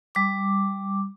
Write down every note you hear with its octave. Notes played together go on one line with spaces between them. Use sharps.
G3 D6